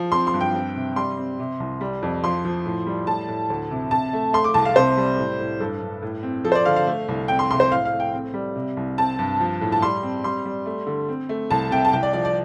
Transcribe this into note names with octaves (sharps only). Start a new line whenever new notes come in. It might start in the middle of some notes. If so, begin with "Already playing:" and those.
Already playing: F3
C4 C6
C6
G2
G5
C4
C3
G3 C6
C4
C3
C2
G3
F2
F3 C6
F3
A2
G3
A2 A5
A2
D2
C3
C3 A5
A3
A3 C6
D6
C2 A5
F5
C3 C5
G3
A2
A2
G2 A4
G2
A2
C4
F3 A4
C5
D5
D3 F5
F5
A3
C2
C4 G5
C6
C3 C6
C5
A2 F5
F5
A3
G5
C4
G3
C3
C2
C4 A5
G2
F3
A2
A5
G3 C6
C4
G3 C6
G3
A3
D3
C4
A3
C2 A5
C3 G5
A5
C2 G5
D5
F3 D5
D5